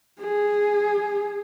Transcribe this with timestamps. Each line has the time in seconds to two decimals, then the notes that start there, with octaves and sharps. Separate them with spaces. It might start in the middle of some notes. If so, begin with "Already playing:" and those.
0.21 G#4